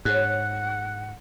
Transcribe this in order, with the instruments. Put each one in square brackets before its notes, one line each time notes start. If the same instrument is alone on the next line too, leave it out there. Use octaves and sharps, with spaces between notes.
[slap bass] G#2 [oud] G#4 C#5 [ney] F#5 [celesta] F#6